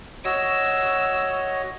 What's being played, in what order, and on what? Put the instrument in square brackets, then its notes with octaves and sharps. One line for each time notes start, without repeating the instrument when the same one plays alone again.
[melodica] F#4 C#5 D#5 [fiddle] E6